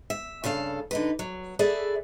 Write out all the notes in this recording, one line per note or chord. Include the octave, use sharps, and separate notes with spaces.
E5
G2 C#3 A4 F5
D3 D#4 B4
F#3
G#4 A4 B4 D5 E5